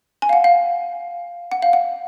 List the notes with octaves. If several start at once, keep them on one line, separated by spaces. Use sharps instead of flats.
G#5
F5
F#5
F5
F#5
F5
F#5